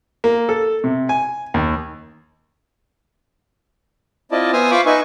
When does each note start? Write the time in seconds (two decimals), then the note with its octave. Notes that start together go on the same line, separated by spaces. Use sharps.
0.24 A#3
0.49 A4
0.84 C3
1.09 G#5
1.54 D#2
4.32 C4 E4 F4 D5 D#5 A5
4.53 B3 C5 E5 G#5 D#6 F6
4.71 F4 C5 F5 B5 C#6 D6
4.86 D#4 B4 E5 G#5 C#6